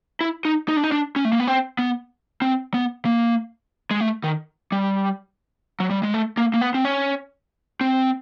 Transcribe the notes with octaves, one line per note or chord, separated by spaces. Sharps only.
E4
D#4
D#4
D4
D#4
D4
C#4
A3
A#3
B3
C4
B3
C4
B3
A#3
G#3
A3
D#3
G3
F#3
G3
G#3
A3
A#3
A#3
B3
C4
C#4
C4